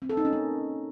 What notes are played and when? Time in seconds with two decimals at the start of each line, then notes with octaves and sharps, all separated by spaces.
0.02 C4
0.09 A4
0.17 D#4
0.25 C#4
0.33 A#3